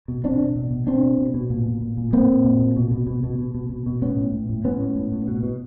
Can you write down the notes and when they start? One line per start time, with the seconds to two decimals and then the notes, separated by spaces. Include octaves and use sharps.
0.08 B2
0.24 B2 C4 D4
0.40 B2
0.56 B2
0.71 B2
0.87 B2 C4 D4
1.03 B2
1.18 B2
1.34 B2
1.50 A#2
1.66 A#2
1.81 A#2
1.97 A#2
2.13 A#2 A#3 C4
2.28 A#2
2.44 A#2
2.59 A#2
2.76 B2
2.91 B2
3.07 B2
3.23 B2
3.38 B2
3.55 B2
3.69 B2
3.86 B2
4.02 A2 B3 C#4
4.17 A2
4.32 A2
4.49 A2
4.64 A2 B3 C#4
4.80 A2
4.96 A2
5.12 A2
5.28 B2
5.43 B2